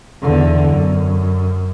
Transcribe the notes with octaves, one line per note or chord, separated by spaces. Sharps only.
E2 D3
F#2